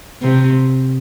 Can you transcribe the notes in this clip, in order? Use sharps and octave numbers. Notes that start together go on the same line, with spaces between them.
C3